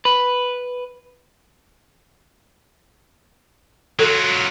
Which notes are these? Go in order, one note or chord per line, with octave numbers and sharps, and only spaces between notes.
B4
F#3 F4 A4